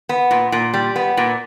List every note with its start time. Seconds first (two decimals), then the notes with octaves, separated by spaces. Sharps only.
0.09 B3
0.31 A#2
0.52 A#2
0.74 G3
0.96 B3
1.17 A#2